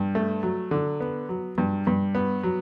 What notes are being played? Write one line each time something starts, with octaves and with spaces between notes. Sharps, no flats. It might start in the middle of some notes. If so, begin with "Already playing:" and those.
Already playing: G2
A3
F#3
D3
B3
F#3
G2
G2
B3
F#3